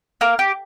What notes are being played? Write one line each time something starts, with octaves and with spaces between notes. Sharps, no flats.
A#3 A#4
G4